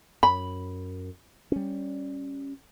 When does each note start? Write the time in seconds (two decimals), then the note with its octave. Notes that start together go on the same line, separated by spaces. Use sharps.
0.23 F#2 B5
1.52 G3 C#4